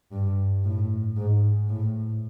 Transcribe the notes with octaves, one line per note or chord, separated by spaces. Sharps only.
G2
A2
G#2
A2